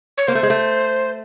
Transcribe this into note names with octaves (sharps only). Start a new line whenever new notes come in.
C#5
A#3 C5
A3
G#3
A3